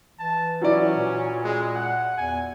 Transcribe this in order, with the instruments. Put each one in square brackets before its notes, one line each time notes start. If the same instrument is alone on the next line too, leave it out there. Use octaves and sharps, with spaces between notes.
[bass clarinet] E3 [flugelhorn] A5
[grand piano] F#3 E4 D5 [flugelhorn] C#4
[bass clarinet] A#2
[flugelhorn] G#3
F#5
[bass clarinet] E2 [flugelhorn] G#5